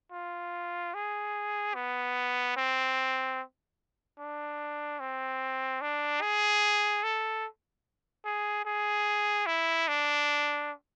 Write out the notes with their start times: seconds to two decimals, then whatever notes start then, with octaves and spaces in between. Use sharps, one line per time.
0.12 F4
0.94 G#4
1.75 B3
2.56 C4
4.19 D4
5.00 C4
5.81 D4
6.22 G#4
7.03 A4
8.25 G#4
8.65 G#4
9.46 E4
9.88 D4